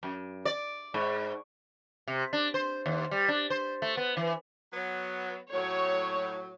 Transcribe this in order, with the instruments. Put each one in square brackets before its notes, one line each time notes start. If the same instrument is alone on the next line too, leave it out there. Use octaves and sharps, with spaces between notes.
[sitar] F#2
D5
G#2
C3
D4
C5
D#2
G3
D4
C5
A3
B3
E3
[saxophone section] F#3 B3
[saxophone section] A2 F#3 [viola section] C#5